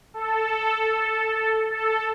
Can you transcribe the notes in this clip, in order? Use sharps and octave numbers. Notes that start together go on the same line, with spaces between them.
A4
A4